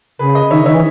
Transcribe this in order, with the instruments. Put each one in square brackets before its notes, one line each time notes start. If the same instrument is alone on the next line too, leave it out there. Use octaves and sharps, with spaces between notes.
[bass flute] C#3 [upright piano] G#4 B4
[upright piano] B4 D#5
[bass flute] D#3 [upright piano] C#5 E5
[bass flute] D#3 [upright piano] C#5 E5
[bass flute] E3